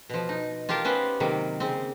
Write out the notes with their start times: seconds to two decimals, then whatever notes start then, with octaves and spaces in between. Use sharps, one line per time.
0.10 B2 F3
0.29 D#4
0.69 F4 G4 A#4 F5 A5
0.85 B3 C#4 B4 C5
1.20 C3 D#3 F#3 A#3
1.60 C#3 C4